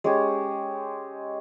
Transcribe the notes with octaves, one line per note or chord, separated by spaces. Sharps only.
G#3 C#4 G4 C#5